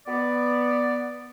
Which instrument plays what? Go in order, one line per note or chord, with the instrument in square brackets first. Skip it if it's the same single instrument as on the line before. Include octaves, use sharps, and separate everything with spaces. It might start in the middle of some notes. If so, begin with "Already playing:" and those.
[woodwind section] B3 D5